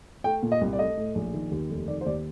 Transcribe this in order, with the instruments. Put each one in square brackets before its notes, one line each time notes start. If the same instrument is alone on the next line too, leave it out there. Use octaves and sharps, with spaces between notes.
[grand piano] A3 G5
A#2
D#5
C2
D5
A3 D#5
A2
A#1
D#3
D#2
F1
D#3 D5
C5
D#2 D5